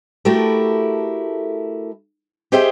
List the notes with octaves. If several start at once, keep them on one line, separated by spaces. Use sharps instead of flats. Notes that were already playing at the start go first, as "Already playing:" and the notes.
A3 E4 F#4 G4 A4 A#4
G4 G#4 C5 D#5 E5 G5